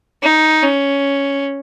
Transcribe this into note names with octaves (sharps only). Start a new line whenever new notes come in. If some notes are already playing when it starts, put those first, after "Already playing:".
D#4
C#4